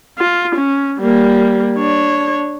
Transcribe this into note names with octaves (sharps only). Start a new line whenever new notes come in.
F4
C#4
G3 A#3
D4 C#5